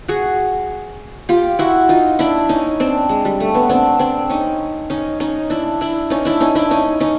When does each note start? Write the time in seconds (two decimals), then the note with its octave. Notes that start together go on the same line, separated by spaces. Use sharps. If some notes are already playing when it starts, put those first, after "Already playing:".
0.08 F#4 G#4
1.29 F4 G4
1.59 E4 F#4
1.89 D#4 F4
2.19 D4 E4
2.49 C#4 D#4
2.80 C4 D4
3.09 G#3
3.25 G3
3.40 A3
3.54 B3 C#4
3.69 C4 D4
4.00 C4 D4
4.30 C#4 D#4
4.90 C#4 D#4
5.20 C#4 D#4
5.50 D4 E4
5.81 D4 E4
6.10 C#4 D#4
6.25 D4 E4
6.40 C#4 D#4
6.55 D4 E4
6.71 C#4 D#4
7.00 C#4 D#4